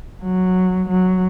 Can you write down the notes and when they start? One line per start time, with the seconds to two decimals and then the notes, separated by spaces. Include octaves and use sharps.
0.24 F#3
0.89 F#3